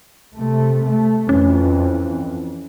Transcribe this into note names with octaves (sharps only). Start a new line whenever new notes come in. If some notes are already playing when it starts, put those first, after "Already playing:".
C3 A3
A3
F2 E3 C#4